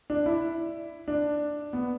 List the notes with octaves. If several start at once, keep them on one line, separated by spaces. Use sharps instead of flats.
D4
E4
D4
B3